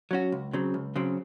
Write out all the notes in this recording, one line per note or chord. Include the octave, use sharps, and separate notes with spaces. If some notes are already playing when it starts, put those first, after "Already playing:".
F#3 C#4 F#4
C#2
C#3 F#3 C4
C#2
C#3 F#3 C4